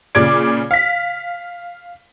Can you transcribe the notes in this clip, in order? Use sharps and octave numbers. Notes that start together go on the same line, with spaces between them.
A#2 C#3 D5 D6 G#6 D7
F5 B6